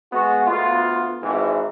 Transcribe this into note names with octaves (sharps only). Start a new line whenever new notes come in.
G#3 B3 F#4
D2 B3 F4
G#1 G#2 D#3 E3